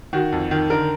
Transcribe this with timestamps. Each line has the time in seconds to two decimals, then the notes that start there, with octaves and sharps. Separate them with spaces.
0.13 D#3 F#4
0.32 F2
0.51 D#3
0.70 D3 A#4